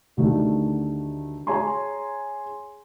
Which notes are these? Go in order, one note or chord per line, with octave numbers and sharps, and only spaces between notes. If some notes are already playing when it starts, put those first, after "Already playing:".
D2 D3 D#3 G3 A3
G#4 C#5 G#5 A#5 C6